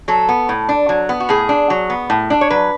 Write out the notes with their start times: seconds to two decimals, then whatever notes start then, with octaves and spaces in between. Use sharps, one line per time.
0.08 F#3 A4
0.29 B3
0.49 A2
0.69 D4
0.89 F#3
1.09 B3
1.20 F#4
1.29 A2 G#4
1.49 D4
1.70 F#3
1.90 B3
2.10 A2
2.30 D4
2.41 C#5
2.50 F#3 B4